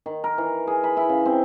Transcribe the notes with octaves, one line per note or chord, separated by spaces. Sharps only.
D#3
A#4
E3
G#4
B5
E4
C#3
C4